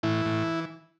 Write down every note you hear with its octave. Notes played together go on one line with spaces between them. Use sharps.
A2 E3 E4
A2